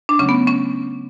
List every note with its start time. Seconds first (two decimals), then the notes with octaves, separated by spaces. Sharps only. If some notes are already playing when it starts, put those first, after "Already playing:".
0.09 D4
0.19 C#3 F#3 A3 C#4
0.29 B3
0.47 C#4